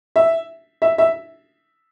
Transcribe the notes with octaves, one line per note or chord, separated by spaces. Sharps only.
E5
E5
E5